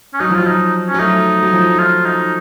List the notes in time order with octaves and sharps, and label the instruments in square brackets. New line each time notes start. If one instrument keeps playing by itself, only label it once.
[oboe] C#4
[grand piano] F#3 [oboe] D#4
[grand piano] F3
[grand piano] F#3 [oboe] F4
[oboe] D#4
C#4
[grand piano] F#3
[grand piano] A3 [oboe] D#4
[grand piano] F#3
F3
[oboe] F4
D#4